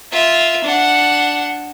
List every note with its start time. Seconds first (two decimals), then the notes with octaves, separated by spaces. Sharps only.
0.12 F4 E5
0.64 D4 F#5